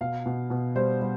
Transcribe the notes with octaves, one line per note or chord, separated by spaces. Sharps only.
B2 F5
B2
B2
G3 C5
G3